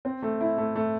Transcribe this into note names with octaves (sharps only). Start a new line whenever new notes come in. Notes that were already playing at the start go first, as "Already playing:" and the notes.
C4
A3
E4
A3
A3